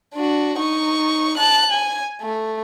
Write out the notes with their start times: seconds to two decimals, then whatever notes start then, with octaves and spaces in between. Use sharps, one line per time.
0.14 D4 F#4
0.57 D#4 C#6
1.37 A5 F#6
1.72 G#5
2.21 A3